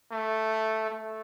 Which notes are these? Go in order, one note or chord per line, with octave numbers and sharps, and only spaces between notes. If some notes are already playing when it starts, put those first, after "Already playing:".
A3
A3